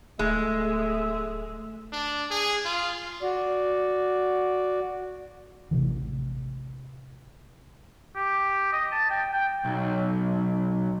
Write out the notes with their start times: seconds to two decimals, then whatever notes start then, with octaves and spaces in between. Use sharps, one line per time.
0.19 D1 G#3 A3 E5
1.92 D4
2.31 G#4
2.65 F4
3.22 F#4 D5
5.71 A1 C3 D#3 E3
8.16 G4
8.72 D#5
8.92 A5
9.10 G5
9.33 G5
9.65 B1